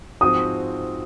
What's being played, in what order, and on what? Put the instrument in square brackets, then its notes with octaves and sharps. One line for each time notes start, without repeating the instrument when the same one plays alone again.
[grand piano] G#2 F3 C4 F#4 [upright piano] D#6